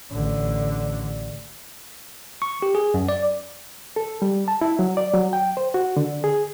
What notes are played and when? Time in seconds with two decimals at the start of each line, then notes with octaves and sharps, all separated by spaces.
0.12 A1 D3
2.42 C#6
2.62 G4
2.75 G#4
2.94 F#2
3.09 D5
3.96 A4
4.22 G3
4.48 A5
4.61 E4
4.79 F#3
4.97 D5
5.14 F#3
5.33 G5
5.57 C5
5.74 F#4
5.97 D3
6.24 G#4